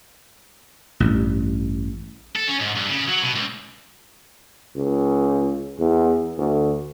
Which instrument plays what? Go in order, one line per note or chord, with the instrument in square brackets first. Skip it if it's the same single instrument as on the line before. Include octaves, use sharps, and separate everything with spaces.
[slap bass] A1 G2
[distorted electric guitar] A4
C#4
G#2
G2
C#3
F#3
B2
C#2
[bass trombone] C#2
E2
D2